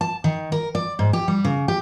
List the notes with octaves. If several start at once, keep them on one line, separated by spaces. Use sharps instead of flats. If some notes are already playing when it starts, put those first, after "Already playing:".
A5
D#3
A#4
D5
G#2
G4
G3
C#3
G4